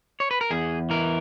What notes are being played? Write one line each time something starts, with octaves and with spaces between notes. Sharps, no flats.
C#5
B4
A#4
E2 G#4
E3 A#4